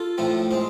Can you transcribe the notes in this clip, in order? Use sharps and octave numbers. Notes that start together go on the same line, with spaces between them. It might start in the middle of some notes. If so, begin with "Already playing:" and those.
Already playing: F4 A4
A2 F3 A3 C4
G#3 C4